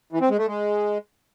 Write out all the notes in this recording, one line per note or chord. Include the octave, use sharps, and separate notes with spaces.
E3
C4
G#3
A3
G#3